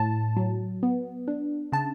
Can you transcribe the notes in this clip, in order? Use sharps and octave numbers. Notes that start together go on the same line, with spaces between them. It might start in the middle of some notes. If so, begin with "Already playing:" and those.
Already playing: A2 A5
F#3
B3
D4
C#3 A5